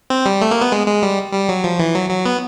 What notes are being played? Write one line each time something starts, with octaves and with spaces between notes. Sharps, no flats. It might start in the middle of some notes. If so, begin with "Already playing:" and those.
C4
G3
A3
A#3
B3
G#3
G#3
G3
G3
F#3
F3
E3
F#3
F#3
B3